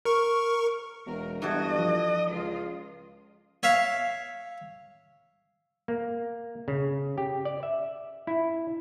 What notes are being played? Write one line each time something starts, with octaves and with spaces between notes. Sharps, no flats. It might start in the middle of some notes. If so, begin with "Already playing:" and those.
A#4 C#6
E1 A#4
G2 E3 F#4 A4 D#5
F3
C#2 F4
C#5 E5 F5
A#3
C#3
G4
D5
E5
E4